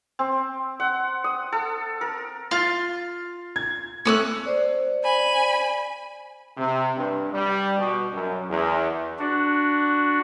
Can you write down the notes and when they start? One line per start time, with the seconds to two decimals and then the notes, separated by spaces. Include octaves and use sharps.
0.19 C4
0.80 F#5
1.24 D#6
1.52 A4
2.01 A#4
2.51 F4 F6 A6
3.56 G#6
4.05 A3 C4 C#4 D#6 E6 F#6
4.46 C5 D5
5.04 G#5 B5
6.57 C3
6.97 G2
7.32 G3
7.78 B2
8.12 F#2
8.49 E2
9.19 D4 F#4